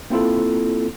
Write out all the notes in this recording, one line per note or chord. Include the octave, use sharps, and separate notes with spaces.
A#3 C4 E4 F4 A4